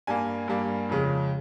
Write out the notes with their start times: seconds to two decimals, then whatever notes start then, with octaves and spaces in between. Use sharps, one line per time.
0.07 G2 G3 A#3 G#5
0.48 G2 G3 A#3
0.89 F2 C#3 G#3